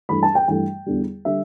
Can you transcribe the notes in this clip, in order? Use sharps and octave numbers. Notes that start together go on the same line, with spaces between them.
G2 E3 A3 B5
A5
G5
G2 E3 A3 G5
E2 D3 G3
D3 G3 E5